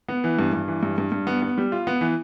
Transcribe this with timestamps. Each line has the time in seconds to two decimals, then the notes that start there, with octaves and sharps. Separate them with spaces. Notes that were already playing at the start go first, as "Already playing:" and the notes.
0.09 B3
0.24 E3
0.39 G2
0.53 G2
0.68 E3
0.83 G2
0.98 G2
1.12 G2
1.27 B3
1.42 B3
1.58 G3
1.72 F4
1.87 B3
2.01 E3